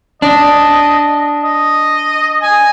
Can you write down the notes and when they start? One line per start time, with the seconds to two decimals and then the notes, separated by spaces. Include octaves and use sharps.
0.22 D4 D#5
1.44 D#5
2.42 G#5